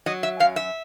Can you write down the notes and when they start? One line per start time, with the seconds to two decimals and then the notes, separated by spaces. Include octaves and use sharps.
0.06 F#3 D#5
0.23 E5
0.40 F#2 F5
0.56 E5